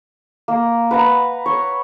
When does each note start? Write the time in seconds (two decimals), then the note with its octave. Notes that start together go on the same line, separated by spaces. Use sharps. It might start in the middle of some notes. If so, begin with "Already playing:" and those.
0.48 A#3
0.91 B4 F#5 A#5
1.46 C#5